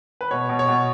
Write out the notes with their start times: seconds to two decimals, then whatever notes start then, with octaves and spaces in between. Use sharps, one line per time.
0.21 B4
0.31 B2 C#5
0.49 B2
0.59 C#5
0.68 B2